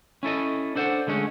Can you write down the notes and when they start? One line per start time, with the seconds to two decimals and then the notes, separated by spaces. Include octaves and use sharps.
0.23 C#4 E4 A4 D#5
0.75 D4 A4 C5 F#5
1.07 D3 G#3 A3 C#4